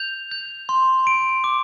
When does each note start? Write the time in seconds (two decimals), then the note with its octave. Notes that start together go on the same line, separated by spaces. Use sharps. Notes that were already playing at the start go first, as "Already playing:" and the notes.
Already playing: G6 F7
0.31 G6
0.69 C6
1.07 D7
1.44 D6